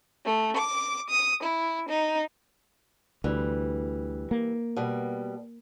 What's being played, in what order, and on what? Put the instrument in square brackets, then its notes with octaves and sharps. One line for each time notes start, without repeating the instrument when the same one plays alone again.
[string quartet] A3
D6
D#6
E4
D#4
[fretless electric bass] D2 [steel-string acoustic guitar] E3 G3
[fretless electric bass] A#3
[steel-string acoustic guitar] B2 G3